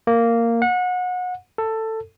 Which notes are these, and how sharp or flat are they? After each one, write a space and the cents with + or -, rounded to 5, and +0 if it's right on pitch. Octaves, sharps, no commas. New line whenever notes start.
A#3 -10
F#5 -30
A4 +15